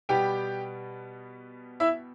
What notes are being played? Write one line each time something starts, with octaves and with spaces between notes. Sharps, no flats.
B2 G3 B3 G4 G5
E4 E5